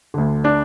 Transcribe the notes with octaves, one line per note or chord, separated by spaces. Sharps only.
D2 D3
D4 D5